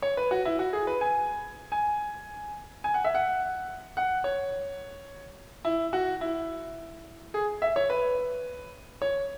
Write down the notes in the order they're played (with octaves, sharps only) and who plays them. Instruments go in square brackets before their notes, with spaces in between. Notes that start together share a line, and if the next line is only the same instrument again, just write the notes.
[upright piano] C#5
B4
F#4
E4
F#4
G#4
B4
G#5
G#5
G#5
F#5
E5
F#5
F#5
C#5
E4
F#4
E4
G#4
E5
C#5
B4
C#5